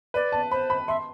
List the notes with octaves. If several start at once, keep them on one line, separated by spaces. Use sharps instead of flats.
B4 D5
A5
C5 B5
B5
E5 C6